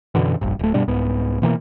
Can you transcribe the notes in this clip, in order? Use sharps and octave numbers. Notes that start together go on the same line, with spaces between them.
F#2 B2 D3 E3
F1 A#1 G2
D1 A3
G2 B2 G3 D4
C2 G#2 B3
B2 E3 F#3 A#3